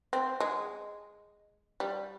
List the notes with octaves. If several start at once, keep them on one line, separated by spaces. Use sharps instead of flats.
C4
G#3
G3